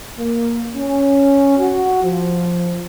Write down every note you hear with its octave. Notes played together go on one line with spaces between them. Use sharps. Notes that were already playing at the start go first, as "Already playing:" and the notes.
A#3
C#4
F#4
F3